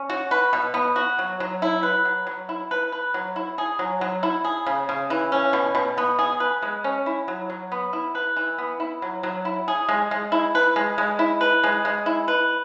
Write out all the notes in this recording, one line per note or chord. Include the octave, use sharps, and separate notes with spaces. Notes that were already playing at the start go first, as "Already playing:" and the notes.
Already playing: C#4
F#4
B4
B2
B3
F#4
F#3
F#3
E4
B4
F#3
F#3
E4
B4
B4
F#3
E4
G#4
F#3
F#3
E4
G#4
C#3
C#3
E3
C#4
B2
B2
B3
G#4
B4
G#3
C#4
E4
F#3
F#3
B3
E4
B4
E3
B3
E4
F#3
F#3
E4
G#4
G#3
G#3
E4
B4
G#3
G#3
E4
B4
G#3
G#3
E4
B4